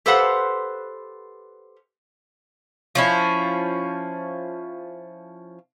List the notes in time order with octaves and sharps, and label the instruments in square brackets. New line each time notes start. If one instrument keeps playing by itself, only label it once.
[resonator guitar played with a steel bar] G4 A4 B4 C5 F5 F#5
[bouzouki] F3 C#4 E4